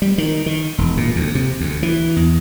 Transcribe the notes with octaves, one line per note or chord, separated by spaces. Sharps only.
G3
D#3
D#3
E1
A#2
D2
C3
D2
E3
E2